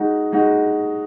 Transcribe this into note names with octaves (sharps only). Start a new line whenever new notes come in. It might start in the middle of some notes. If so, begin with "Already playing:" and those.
Already playing: G#3 D#4 F#4
G#3 D#4 F#4